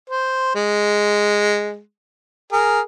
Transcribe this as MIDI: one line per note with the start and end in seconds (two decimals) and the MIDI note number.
0.10 0.53 72
0.55 1.80 56
2.52 2.80 68
2.52 2.80 70